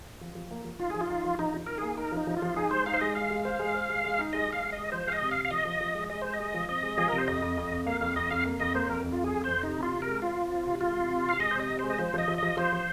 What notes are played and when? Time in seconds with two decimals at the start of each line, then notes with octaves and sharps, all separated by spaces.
0.21 F3
0.35 F3
0.51 A#3
0.64 F3
0.79 D#4 F4
0.90 F3 G#4
1.01 F4
1.09 D#4
1.24 F3
1.39 F3 D#4
1.54 F3
1.67 D#4 A#4
1.78 A#3 G#4
1.97 D#4 A#4
2.12 F3
2.17 D#4
2.27 F3
2.37 F4
2.42 F3
2.56 D#4 G#4
2.71 G#3 C5
2.86 D#4 F5
2.94 C5
3.01 G#3 D#5
3.15 G#3 F5
3.30 G#3
3.45 C5
3.59 G#3
3.74 C5
3.89 G#3
4.04 G#3
4.19 D#4
4.33 G#3 D#5
4.47 G#3
4.53 F5
4.63 G#3
4.72 D#5
4.77 G#3
4.92 F3 C5
5.07 G#3 F5
5.12 D#5
5.21 C3
5.31 F5
5.37 C3
5.45 F5
5.51 F3 D#5
5.65 F3
5.81 F3
5.95 G#3
6.10 G#3 D#5
6.22 G#3 C5
6.34 D#5
6.40 G#3
6.54 F3
6.69 C4 D#5
6.83 G#3
6.98 F3 G#4
7.08 C3 A#4
7.18 C5
7.28 F2 D#5
7.42 F2
7.57 F2
7.71 F2
7.86 A#3 F5
8.01 F2 F5
8.16 F2 D#5
8.31 F2 F5
8.45 A#3
8.60 F2 D#5
8.74 A#3 C5
8.90 F2 A#4
9.04 F2
9.12 F4
9.19 F2 G#4
9.34 F2
9.44 F2 C5
9.63 C3 D#4
9.78 C3
9.83 F4
9.93 C3
10.02 A#4
10.07 G#3
10.22 C4 F4
10.37 C4
10.52 C4
10.66 C3
10.80 G#3 F4
10.96 C3
11.10 C3
11.25 C3 F5
11.39 G#3 D#5
11.51 C5
11.55 C3 D#5
11.69 C3
11.79 G#3 C5
11.90 D#5
11.98 F3 C5
12.14 F3 D#5
12.28 F3
12.38 F3 D#5
12.57 F3 C5
12.73 F3